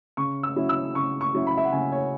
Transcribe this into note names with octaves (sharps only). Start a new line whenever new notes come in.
C#3 C#6
E6
F#3 C#4 E4
E6
C#3 C#6
C#6
F#3 C#4 E4
B5
E5
F#5
C#3 G#5
C#5